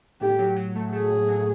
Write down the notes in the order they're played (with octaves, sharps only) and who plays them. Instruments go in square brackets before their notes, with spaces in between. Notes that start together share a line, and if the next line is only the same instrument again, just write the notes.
[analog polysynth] A2 [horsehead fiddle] G4
[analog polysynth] F#3
F#3
A3
[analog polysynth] A3 [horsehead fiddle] G#4
[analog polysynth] A2
F#3